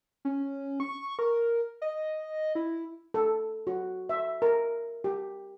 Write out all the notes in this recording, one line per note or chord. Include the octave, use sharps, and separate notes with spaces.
C#4
C#6
A#4
D#5
E4
A4
F#4
E5
A#4
G4